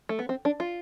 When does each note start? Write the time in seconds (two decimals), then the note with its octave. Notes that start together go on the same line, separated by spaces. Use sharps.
0.09 A3
0.19 B3
0.29 C4
0.45 D4
0.60 F4